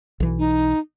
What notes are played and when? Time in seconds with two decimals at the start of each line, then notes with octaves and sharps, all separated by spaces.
0.20 B1 E3
0.39 D#4